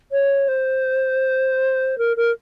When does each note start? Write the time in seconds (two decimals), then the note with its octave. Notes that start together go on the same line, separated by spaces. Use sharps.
0.12 C#5
0.48 C5
1.98 A#4
2.17 A#4